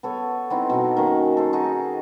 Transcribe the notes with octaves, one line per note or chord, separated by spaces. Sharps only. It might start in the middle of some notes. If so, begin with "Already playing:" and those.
B3 A4 C#5
B3 C4 D#4 E4
B2 D#4
D#3 A#3 C#4
A4 C5
D#4 F#4 G#4